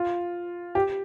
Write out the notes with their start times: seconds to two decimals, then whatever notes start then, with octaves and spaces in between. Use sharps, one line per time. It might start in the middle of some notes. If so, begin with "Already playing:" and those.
Already playing: F4
0.75 G4